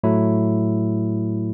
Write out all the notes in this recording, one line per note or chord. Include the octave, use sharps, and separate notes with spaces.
A2 F#3 A3 E4